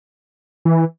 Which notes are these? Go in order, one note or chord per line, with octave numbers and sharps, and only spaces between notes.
E3